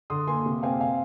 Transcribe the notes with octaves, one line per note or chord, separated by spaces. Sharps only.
D3 C6 D#6
A#3 G#5 C6
C3
C4 F5 G#5
F5 G#5